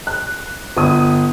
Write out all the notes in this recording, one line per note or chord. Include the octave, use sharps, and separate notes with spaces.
F#6
G1 D#6